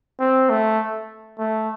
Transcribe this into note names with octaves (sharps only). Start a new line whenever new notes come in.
C4
A3
A3